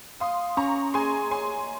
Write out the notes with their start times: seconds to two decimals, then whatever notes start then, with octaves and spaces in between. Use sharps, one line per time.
0.20 F5 C6 D#6
0.57 C#4 A#5 C#6
0.94 G#4 G#5 C6
1.31 C#5 G#5 C6